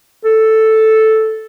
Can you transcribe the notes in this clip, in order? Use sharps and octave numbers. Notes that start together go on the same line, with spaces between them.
A4